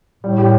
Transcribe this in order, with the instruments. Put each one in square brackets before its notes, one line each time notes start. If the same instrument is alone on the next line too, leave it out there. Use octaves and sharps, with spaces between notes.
[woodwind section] A2 [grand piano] G3
[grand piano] G4